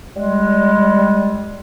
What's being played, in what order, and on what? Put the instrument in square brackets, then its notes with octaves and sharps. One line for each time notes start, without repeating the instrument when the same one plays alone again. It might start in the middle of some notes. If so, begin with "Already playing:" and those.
[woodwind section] G3 G#3